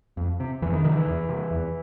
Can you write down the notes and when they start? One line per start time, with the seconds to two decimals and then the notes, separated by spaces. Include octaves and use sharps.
0.17 F2
0.40 C3
0.62 F2 E3
0.73 D#3
0.84 C3 D#3
0.96 E3
1.07 E2
1.29 C3
1.51 E2